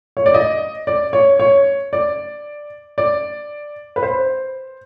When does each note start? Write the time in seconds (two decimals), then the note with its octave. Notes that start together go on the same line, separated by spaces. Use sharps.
0.17 C#5
0.26 D5
0.34 D#5
0.87 D5
1.13 C#5
1.40 C#5
1.93 D5
2.98 D5
3.96 B4
4.03 C5